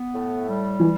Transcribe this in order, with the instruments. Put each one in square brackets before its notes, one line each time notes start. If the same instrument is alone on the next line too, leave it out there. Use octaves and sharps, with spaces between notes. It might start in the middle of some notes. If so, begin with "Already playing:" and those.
Already playing: [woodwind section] B3
A2
G3
[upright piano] E3